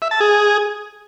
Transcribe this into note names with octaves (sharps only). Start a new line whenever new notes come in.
E5
A5
G#4